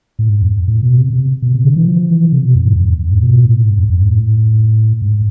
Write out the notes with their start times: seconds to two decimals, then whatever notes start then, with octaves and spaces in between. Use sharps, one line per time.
0.19 A2
0.30 G#2
0.42 F2
0.68 A2
0.83 B2
0.98 C3
1.13 C3
1.42 B2
1.54 C3
1.64 D3
1.76 E3
1.87 F3
2.10 E3
2.33 C3
2.44 B2
2.55 F2
2.67 G#2
2.77 F2
2.89 E2
3.00 F2
3.11 G#2
3.23 B2
3.45 A2
3.68 G#2
3.78 F2
3.89 F2
4.01 G#2
4.12 A2
5.02 G#2